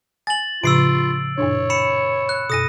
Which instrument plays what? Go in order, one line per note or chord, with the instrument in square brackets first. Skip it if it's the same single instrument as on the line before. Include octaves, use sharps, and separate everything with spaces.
[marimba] G#5 [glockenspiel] A6 F#7
[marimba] A2 C#3 F3 [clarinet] F4 [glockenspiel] E6 C7 D7
[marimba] F#2 A#2 D4 [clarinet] C#5
[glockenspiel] B5 C#7 E7
F#6
[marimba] F#2 B2 [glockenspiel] D#6 A#6 D#7